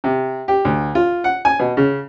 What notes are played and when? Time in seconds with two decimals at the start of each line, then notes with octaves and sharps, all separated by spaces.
0.04 C3
0.48 G4
0.65 D2
0.95 F4
1.24 F#5
1.45 G#5
1.59 B2
1.77 C#3